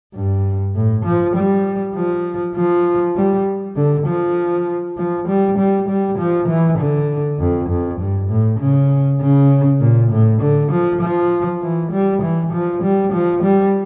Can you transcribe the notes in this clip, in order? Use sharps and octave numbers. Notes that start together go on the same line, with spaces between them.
G2
A2
F3
G3
F3
F3
G3
D3
F3
F3
G3
G3
G3
F3
E3
D3
F2
F2
G2
A2
C#3
C#3
A#2
A2
D3
F3
F3
E3
G3
E3
F3
G3
F3
G3